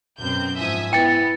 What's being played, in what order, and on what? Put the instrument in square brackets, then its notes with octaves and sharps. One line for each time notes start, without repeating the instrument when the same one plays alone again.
[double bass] F#2 B2 [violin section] C4 G6
[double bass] G#2 F3 [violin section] E5 G#5 D#6
[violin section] B3 [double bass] E4 [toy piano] G5 [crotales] A6 C#7